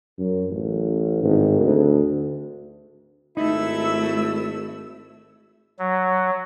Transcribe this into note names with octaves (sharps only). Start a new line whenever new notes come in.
F#2
A1
G#1
D2
G#1 A3 D#4 E4 E6
F#3